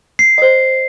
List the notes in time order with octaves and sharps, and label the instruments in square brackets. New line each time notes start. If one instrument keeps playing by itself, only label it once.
[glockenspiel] C7
[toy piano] C5 D#5